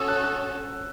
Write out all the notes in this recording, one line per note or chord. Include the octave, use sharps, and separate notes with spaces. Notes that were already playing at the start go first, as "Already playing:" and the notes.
Already playing: C#4 F#4 A4 C#5 D#6 E6
F#6
F#6